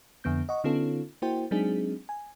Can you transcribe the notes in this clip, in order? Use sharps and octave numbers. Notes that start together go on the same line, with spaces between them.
F2 D3 B3 G6
D#5 F#5 C#6
D3 B3 C#4 D#4 F4 A4
A#3 E4 F#4 C5 G5
F#3 G#3 C4 D4 D#4 G#4
G#5